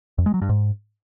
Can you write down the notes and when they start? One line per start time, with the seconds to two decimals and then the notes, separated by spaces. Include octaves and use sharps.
0.18 F2
0.26 G#3
0.34 F#3
0.42 G2
0.49 G#2